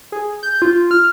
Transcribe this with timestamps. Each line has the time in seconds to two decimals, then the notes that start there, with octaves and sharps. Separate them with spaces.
0.12 G#4
0.43 G6
0.62 F4
0.91 F6